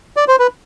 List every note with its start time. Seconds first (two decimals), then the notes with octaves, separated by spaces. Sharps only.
0.16 D5
0.28 C5
0.39 B4